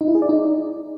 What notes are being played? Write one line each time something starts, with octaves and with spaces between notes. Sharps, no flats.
D#4
E4
G#4
D5
D#4